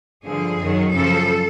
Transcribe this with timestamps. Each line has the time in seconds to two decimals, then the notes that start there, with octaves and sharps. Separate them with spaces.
0.24 G2 D3 F3 G#4
0.58 F#2 D#3 F#3
0.91 F#2 C#3 F3 A4